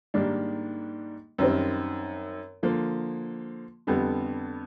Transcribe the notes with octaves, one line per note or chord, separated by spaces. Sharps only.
G#2 D#3 G3 A#3 D4
F#2 D#3 G3 C4
D3 F3 A#3
F2 D3 G3 B3